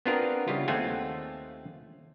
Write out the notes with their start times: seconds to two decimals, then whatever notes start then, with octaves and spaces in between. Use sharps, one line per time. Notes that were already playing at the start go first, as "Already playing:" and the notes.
0.06 B3 C4 D4 F4 G#4 A#4
0.48 C#3 G3 E4 F4
0.68 D#2 A3 C4 F4 F#5 G#5